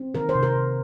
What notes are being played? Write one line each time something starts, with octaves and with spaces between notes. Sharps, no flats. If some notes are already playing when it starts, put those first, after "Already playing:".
Already playing: C4
D#3 A#4
C5
C3
A#4
C3